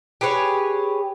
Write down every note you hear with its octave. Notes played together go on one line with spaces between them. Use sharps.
G4 G#4 B4 C#5